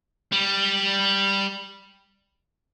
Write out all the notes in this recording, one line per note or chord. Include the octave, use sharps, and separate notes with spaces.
G3